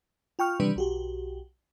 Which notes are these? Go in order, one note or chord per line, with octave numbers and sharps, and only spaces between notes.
F4 G5 C#6 F6
C3 D#3 E3 G3 D4 B4
B1 F#4 G4